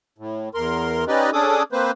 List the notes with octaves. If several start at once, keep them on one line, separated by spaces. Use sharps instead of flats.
A2
E2 A#4 C6
C#4 D#4 G4 B4 D5 D#5
C#4 D4 G#4 A4 D6 D#6
A#3 C4 B4 C5